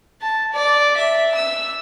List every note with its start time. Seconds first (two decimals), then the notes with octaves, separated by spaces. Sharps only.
0.21 A5
0.53 D5
0.96 E5
1.35 E6